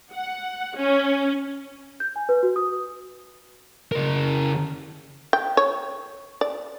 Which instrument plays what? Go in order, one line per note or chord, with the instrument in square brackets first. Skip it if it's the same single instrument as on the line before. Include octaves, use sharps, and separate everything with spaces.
[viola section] F#5
C#4
[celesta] G6
G#5
B4
F#4
D#6
[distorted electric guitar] C#3 A#4
[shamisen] G5
C#5
D5